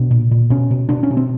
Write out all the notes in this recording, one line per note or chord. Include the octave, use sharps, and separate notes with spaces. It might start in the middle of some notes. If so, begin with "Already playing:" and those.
Already playing: B2 D4
A#2
A#2
B2 C#4
B2
B2 D4
C#4
B2
C4